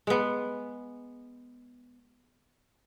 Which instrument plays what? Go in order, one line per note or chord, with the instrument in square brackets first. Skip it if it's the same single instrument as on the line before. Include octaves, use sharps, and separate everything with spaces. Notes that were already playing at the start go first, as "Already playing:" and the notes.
[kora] G#3 B3